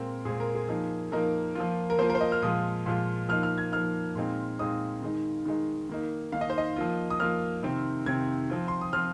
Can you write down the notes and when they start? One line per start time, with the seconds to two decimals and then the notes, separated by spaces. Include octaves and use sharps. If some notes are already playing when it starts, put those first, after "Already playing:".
Already playing: A#2 G#3 C4 A#4
0.25 A#2 G#3 C4 G#4
0.40 A#4
0.55 G#4
0.69 F3 A#3 D#4
1.12 F3 A#3 D#4 A#4
1.55 F3 A#3 F4
1.90 A#4
1.98 F3 A#3 F4 C5
2.10 A#4
2.15 C5
2.21 D#5
2.32 F6
2.42 A#2 F3 G#3 F4 D#6
2.86 A#2 F3 G#3 F4
3.29 F3 A#3 D#4 F6
3.43 F6
3.58 G#6
3.72 F3 A#3 D#4 F6
4.15 A#2 G#3 C4 D#4
4.59 A#2 G#3 C4 D#4 D#6
5.02 D#3 G#3 D#4
5.46 D#3 G#3 D#4
5.89 D#3 A#3 D#4
6.32 D#3 A#3 D#4 F5
6.41 D#5
6.50 C5
6.58 D#5
6.76 F3 A#3 F4
7.10 D#6
7.20 F3 A#3 F4 F6
7.63 C3 D#3 C4
8.06 C3 D#3 C4 G#6
8.50 F3 C4 F4
8.68 C6
8.81 D#6
8.93 F3 C4 F4 F6